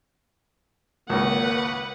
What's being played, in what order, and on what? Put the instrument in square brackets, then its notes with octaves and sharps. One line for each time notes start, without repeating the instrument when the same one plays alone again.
[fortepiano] G#1 C#2 [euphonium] A#3 [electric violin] B4 F#5